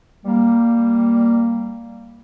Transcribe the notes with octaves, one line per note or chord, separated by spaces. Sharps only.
G3 A#3